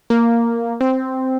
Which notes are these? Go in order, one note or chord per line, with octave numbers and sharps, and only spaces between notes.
A#3
C4